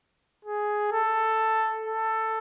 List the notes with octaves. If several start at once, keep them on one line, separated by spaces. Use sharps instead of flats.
G#4
A4
A4